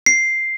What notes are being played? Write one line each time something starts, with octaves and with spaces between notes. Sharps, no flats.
C7